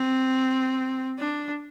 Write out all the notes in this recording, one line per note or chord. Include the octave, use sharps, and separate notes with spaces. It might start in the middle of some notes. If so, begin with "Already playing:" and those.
Already playing: C4
D4